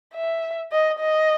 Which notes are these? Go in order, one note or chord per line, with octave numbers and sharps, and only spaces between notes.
E5
D#5
D#5